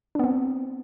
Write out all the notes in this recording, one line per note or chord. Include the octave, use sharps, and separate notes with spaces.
B3 C4 D4